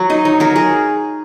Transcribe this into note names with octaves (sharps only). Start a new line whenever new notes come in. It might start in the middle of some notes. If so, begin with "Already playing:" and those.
Already playing: F#3
D#4 D#5
D#4 C#5
F#3 A#4
G#4